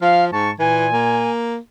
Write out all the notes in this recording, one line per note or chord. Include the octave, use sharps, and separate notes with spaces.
F3 F5
G#2 A5 C#6
A#2 E3 G#5
A#3